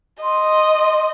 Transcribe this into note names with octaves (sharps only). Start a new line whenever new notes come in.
D#5 C6